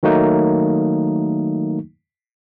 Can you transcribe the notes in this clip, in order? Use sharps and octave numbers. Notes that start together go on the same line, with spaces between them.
D#3 F#3 A3 A#3 D#4